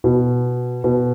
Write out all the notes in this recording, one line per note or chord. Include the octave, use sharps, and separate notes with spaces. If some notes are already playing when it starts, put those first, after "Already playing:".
B2
B2